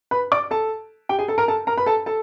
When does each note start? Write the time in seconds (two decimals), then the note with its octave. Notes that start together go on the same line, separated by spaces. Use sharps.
0.11 B4 B5
0.32 D5 D6
0.51 A4 A5
1.09 G4 G5
1.19 G#4 G#5
1.28 A4 A5
1.38 A#4 A#5
1.48 A4 A5
1.67 A#4 A#5
1.77 B4 B5
1.86 A4 A5
2.06 A4 A5